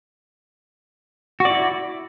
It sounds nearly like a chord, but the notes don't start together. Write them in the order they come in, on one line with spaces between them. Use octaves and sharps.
F#4 D5 E4